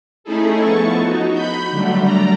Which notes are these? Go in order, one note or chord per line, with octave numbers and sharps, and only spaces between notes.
A3 C#4 D#4 E4 G#4 A4
F3 B3 A5 C#6
D#4 F#4
B5 G6
D3 F#3 G3 A3
D5 A#5